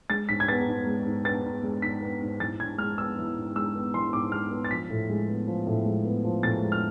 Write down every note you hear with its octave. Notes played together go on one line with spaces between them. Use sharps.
G#3 A6
G#2 B6
G#6
B3 A6
G#2
G#3
G#2
B3 A6
G#2
G#3
G#2 B6
B3
G#2
E3 A6
G#2 G#6
G#3 F6
B3 E6
E3
G#2
G#3 E6
B3
E3 C6
G#2 D6
G#3 F6
B3
A6
F3 B6
A2
G#3
B3
F3
A2
G#3
B3
F3
A2 A6
G#3
F6